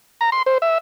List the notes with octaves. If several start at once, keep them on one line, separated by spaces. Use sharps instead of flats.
A#5
C6
C5
E5